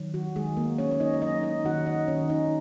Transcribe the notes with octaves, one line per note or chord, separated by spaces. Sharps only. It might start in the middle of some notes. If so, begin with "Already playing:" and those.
Already playing: D#3 F#3
F#4
D#3 G#3 G#4
A#3 A#4
C#4 C#5
C#5
D#4 D#5
C#5
F#3 D#4 D#5
D#4 D#5
D#3 F#4 F#5
D#4 D#5
D#3 C#4 C#5
D#4 D#5